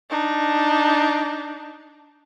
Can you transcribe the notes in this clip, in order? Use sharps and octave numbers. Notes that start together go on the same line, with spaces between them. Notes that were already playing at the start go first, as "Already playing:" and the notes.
D4 D#4